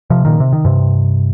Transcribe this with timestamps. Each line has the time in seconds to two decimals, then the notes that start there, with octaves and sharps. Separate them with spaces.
0.10 C3 F3
0.25 A#2 D#3
0.40 C3
0.53 D#3
0.65 G2 C3